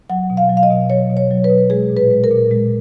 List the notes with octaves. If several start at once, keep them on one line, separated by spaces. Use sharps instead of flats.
F#3 F#5
B2
F5
F#3
F5
D#5
B2
F#3 C#5
B2
C#5
F#3
B4
B2
G#3 G#4
A#2
B4
G#3
A#4
A#2
G#3